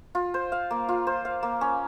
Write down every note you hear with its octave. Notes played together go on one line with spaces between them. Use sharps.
F4
C5
F5
A#3
F4
C5
F5
A#3
C#4